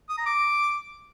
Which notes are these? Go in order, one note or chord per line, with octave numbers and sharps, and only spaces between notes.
D#6
A#5
D6